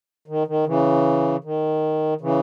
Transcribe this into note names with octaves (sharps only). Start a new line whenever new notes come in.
D#3
D#3
C#3 E3
D#3
C#3 E3